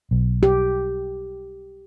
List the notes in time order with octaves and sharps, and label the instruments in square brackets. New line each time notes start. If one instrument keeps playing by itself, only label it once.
[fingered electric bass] B1
[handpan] G4